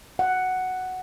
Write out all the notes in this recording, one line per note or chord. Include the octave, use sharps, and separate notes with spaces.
F#5